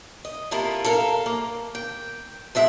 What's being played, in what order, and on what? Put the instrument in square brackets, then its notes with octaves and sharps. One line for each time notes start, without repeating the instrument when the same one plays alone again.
[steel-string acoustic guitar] D#5
C3 A#3 E4 F4 A4 A#4
A4 A#4 F5
A#3
G5
F3 G#3 E5 F#5